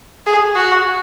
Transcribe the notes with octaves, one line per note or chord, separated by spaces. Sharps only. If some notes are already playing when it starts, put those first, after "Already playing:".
G#4
F#4